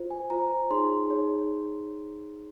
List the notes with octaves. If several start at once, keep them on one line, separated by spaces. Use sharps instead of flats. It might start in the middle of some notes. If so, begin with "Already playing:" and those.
Already playing: F4 C5
G#5
F4 C5 A#5
D#4 G#4 C#5 C6
D#4 G#4 C#5